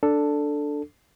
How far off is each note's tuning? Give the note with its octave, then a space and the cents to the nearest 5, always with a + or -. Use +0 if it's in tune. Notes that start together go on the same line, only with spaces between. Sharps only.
D4 +0 A4 +5